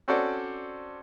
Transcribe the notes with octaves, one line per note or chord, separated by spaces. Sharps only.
C4 C#4 F#4 A4 C5 D5